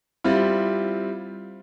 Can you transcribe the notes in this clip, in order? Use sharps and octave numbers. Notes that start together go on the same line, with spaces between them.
G3 C4 E4 F4